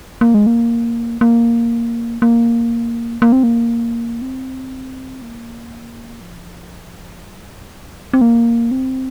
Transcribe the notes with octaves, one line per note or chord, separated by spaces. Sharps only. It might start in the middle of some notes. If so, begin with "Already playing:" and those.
A#3
G#3
A#3
A#3
A#3
A#3
C4
A#3
C4
A#3
F3
G3
C4
A#3
C4